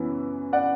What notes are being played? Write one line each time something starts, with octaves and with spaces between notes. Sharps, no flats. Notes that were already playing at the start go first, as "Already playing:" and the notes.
Already playing: F#2 E3 B3 E4
D5 F#5